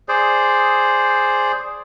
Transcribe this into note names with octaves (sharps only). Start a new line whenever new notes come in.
G#4 C5 D5